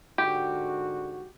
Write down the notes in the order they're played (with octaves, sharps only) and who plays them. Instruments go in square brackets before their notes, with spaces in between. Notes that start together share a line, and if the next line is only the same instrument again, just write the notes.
[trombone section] G#2 D3 F#4 [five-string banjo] G4